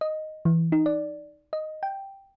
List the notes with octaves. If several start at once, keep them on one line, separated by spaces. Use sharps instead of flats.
D#5
E3
D#4
D5
D#5
G5